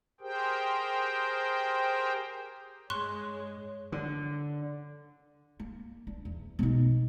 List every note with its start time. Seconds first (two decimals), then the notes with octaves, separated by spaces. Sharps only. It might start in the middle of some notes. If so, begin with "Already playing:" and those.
0.21 G4 G#4 A#4 C5 G5
2.90 G2 G#3 C#5 C6 C#6 F#6
3.92 D3
5.60 A#3
6.07 D4
6.25 E2
6.59 B2 D#4